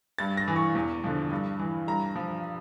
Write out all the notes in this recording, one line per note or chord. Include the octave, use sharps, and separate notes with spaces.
G2 A6
A#6
E3
C#6
E2
D3 F3
G2
E3
G2 A#5
F3